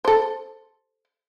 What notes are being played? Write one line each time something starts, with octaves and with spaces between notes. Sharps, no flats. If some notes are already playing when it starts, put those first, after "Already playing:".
A4 C5